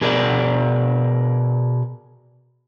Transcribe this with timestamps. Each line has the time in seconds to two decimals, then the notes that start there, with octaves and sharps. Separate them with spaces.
0.01 B2 G#4 A#4 D5